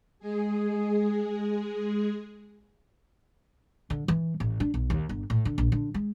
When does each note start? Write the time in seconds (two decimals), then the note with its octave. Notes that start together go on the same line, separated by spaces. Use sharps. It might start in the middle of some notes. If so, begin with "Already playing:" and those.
0.19 G#3 G#4
3.90 D3
4.08 E3
4.40 A1
4.60 D4
4.74 B1
4.90 D#2
5.09 G1
5.30 A2
5.45 D3
5.58 A#1
5.72 D3
5.94 G#3